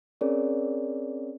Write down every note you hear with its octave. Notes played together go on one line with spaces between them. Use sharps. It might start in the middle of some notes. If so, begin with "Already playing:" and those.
C4 C#4 G#4 A#4 C#5 D5